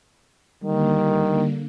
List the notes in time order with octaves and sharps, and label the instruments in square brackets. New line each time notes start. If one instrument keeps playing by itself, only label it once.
[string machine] D3 A#3 [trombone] D#3 [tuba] G3